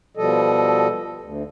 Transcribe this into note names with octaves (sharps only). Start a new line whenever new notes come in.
B2 F3 G3 A4 D#5
D2